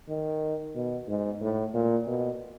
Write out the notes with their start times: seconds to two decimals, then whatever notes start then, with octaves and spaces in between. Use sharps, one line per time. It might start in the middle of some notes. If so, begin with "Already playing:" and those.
0.09 D#3
0.75 B2
1.08 G#2
1.41 A2
1.74 A#2
2.07 B2